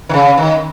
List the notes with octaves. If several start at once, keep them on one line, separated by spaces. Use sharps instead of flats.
D#3
C#3
D#3